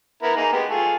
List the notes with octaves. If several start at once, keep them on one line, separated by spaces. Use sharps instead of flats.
B3 E4 A#4
A#3 D#4 G#4
G#3 B3 G4
A3 F4 G#4